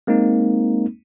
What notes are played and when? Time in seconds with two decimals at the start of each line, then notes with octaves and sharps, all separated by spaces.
0.07 G#3 A#3 C4 D#4